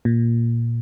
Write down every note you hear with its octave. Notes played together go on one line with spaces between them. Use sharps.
A#2